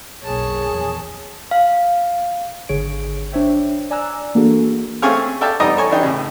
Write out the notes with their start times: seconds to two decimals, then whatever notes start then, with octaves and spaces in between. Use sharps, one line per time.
0.24 F#1 B1 A#3 G#4 C#5 A5
0.70 A#1 E2
1.51 F5
2.69 G#1 D3 G#4 C#5 D7
3.32 D4 C5 C#5 E5 G5
3.90 D5 G#5 A#5 E6 F#6
4.35 E3 A#3 D4 F#4 G#4 A4
5.02 A3 C4 C#4 G#4 C#5 F5
5.41 A4 D5 E5 F5 G5 A5
5.60 G3 B3 D#4 A#5 D#6
5.77 A4 C#5 G#5
5.90 E3 D4 D#4 G4
6.03 A2 C#3